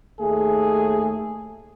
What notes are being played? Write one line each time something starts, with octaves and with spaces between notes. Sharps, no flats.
D#2 A3 G#4